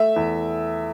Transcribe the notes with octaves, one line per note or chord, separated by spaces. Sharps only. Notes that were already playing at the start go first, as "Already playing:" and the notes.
Already playing: A3 E5
E2